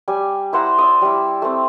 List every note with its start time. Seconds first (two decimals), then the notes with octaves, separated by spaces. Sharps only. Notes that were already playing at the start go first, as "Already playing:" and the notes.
0.08 G3 G#5
0.53 E4 C5 F#5 A#5
0.78 D5 E5 D#6
1.02 G3 E4
1.42 A3 C4